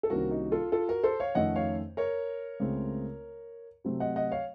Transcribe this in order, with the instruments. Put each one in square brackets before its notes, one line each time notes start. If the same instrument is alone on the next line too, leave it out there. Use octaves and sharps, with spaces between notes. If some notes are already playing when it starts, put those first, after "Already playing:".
[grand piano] A4
C2 C3 D#3 A#3 C#4 F#4 A#4
D#4 F#4
F4 A4
F4 A4
F#4 A#4
A4 C5
C#5 F5
F2 D#3 A3 C#4 D#5 F#5
C#5 F5
A#4 C#5
C#2 C#3 A3 C4
C3 F#3 A3 C4
D#5 F#5
D#5 F#5
C#5 F5